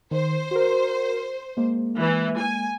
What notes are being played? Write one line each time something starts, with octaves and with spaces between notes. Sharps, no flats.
D#3 C5
F#4 A#4
G#3 A#3
E3
G#5